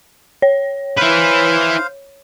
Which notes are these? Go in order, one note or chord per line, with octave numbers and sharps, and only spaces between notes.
C#5
E4 B4 C5 F5